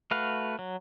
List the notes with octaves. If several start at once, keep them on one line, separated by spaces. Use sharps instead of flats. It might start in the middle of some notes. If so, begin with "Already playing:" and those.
A3 F#4 B4 F5
F#3